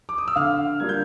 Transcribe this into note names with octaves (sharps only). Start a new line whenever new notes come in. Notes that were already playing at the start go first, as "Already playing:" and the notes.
D6
D#6
E6
D3 F5 F6
G3 A#3 D4 F4 G#6
G6